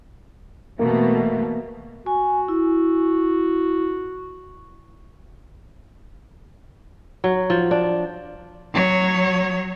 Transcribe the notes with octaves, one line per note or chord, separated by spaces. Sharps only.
B2 E3 A3 A#3
F#4 G#5
E4
F#3
F3
D4
F#3 C#5